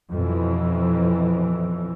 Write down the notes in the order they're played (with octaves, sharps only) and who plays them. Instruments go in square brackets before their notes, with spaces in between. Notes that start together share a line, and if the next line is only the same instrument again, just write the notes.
[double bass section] F2 B2 E3